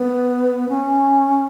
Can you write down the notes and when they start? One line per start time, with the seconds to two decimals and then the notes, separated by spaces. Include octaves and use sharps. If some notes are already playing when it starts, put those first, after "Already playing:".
Already playing: B3
0.69 C#4